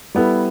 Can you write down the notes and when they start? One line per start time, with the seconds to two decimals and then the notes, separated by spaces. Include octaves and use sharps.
0.15 G3 B3 E4 A4